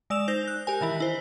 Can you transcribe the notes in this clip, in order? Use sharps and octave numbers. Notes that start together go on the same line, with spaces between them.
G#3 D5 E6 E7 F7
D#4 C5 G6 A#6 F7
F#6
G4 A#4 G#5
D#3 E3 E4
E4 C5